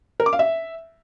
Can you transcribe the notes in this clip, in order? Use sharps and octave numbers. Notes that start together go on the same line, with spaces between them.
A#4
D6
F5
E5